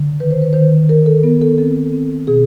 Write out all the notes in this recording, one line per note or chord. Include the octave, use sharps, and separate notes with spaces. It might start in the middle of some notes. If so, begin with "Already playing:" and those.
Already playing: D3
D#3 B4
C5
B4
D#3 C5
B4
D#3 A#4
A4
B3 A#4
A4
C4 A4
C4
B2 G#4